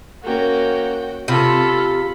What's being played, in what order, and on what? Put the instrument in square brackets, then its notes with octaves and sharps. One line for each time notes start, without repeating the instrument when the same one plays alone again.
[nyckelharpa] A#3 C#4 [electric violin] F#4 G5
[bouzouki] C3 [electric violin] F4 A4 [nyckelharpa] B5